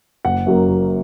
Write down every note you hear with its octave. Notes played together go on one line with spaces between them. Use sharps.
F#1 F#5
F#2 F#3 A#3
F#1